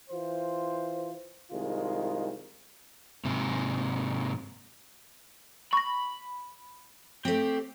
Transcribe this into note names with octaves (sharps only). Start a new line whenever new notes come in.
E3 F4 C5
C2 D#3 G#3 F4
G#2 C3
B5 C#6 A#6
A3 C4 G4